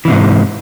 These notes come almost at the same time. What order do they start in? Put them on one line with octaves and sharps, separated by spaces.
E3 C3 G#2